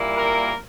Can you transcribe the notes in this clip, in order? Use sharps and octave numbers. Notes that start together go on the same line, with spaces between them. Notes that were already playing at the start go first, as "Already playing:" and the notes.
Already playing: A#2 G3 A#3 E4
A#4